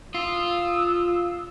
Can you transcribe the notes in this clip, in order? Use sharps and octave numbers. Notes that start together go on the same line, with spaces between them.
F4 D#6 E6